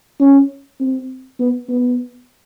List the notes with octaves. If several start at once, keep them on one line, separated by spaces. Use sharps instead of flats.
C#4
C4
B3
B3